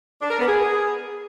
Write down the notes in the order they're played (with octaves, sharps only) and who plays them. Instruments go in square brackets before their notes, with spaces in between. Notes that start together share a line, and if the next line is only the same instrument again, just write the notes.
[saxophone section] D4
A#4
B3
G#4